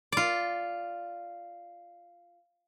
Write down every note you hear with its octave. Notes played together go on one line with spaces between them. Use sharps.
F4 D5